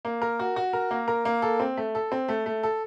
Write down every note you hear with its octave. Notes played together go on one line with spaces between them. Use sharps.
A#3
A#4
F#4
F#4
A#4
A#3
A#4
A#3
A4
C4
A3
A4
C4
A3
A3
A4